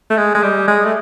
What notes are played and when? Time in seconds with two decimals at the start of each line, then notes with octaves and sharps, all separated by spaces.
0.10 A3
0.17 G#3
0.35 G#3
0.43 G3
0.68 G#3
0.85 A3